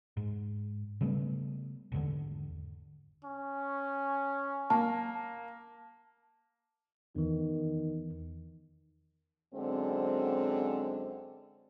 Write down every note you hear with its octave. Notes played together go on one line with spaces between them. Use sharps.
G#2
C#3 G3 A3 B3
G#1 E2 D3 B3
C#4
A#3 A5
E2 D#3 E3
F#2 D3 G#3 C4